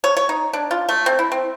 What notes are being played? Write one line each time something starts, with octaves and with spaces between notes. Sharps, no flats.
C#5
C#5
D#4
D4
F4
A3
C4
E4
C4